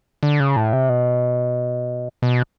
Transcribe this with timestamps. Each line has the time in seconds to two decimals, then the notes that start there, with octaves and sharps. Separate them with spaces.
0.23 D3
0.40 C#3
0.56 A2
0.73 C3
0.89 B2
2.22 B2